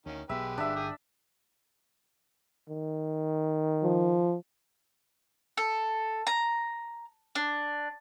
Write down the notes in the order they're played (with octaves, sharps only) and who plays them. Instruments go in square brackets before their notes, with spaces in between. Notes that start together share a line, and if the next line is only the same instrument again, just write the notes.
[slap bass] D2 [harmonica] D#3 C#4
[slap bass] B1 B3 [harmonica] G#3 G4 B4 [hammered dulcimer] E5
[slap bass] G1 [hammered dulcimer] D4 E5
[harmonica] G#4 G5 D#6
[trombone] D#3
[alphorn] F3
[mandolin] A4
A#5
D4